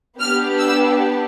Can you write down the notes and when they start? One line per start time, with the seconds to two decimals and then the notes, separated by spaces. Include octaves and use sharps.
0.18 B3 D4 G4 F6
0.58 E6